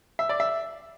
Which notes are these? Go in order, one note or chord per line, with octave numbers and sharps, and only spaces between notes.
E5
D5
E5